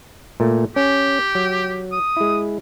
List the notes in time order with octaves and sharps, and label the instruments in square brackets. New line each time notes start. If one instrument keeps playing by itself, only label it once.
[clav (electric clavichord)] A#2 A3
[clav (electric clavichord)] C#4 [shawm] G4
[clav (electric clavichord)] F#3
[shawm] D#6
[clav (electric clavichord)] G#3 E4